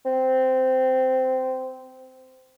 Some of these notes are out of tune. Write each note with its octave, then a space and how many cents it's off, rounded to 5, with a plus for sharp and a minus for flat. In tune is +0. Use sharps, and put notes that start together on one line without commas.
C4 -15